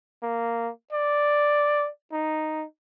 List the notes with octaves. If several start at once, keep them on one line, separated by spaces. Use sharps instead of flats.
A#3
D5
D#4